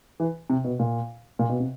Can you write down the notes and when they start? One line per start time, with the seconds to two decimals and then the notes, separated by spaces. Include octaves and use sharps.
0.20 E3
0.50 C3
0.64 B2
0.79 A#2
1.39 A#2
1.49 B2
1.60 C3